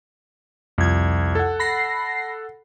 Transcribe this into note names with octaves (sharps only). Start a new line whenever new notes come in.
C2 F2 G#6
A4 F#5
B5 A#6 C7